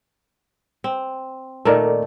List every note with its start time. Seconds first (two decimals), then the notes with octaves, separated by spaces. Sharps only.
0.84 C4
1.65 A#2 D#3 A3 A4 A#4 D5